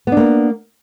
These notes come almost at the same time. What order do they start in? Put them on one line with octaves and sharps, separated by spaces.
B3 D4 A#3